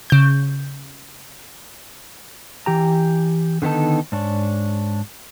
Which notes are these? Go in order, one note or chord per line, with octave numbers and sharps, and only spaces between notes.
C#3 G6
E3 G4 A#5
D3 D#3 B3 D#4 A4
G#2 D4 C#5